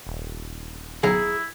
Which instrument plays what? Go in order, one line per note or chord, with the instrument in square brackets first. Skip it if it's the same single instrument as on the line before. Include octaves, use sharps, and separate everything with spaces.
[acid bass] D#1
[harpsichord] B1 C#3 [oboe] E4 [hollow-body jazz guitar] G#4 A#5